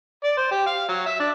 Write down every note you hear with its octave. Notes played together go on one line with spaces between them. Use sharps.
D5
C5
G4
F5
F#3
E5
D4